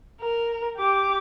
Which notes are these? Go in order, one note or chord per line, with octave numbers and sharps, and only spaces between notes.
A#4
G4 D6